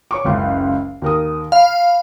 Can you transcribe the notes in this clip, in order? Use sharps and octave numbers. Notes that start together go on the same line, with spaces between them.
C#5 C#6 D6
F#1 C#2 C6
D#2 A#4 D#6
F5 B5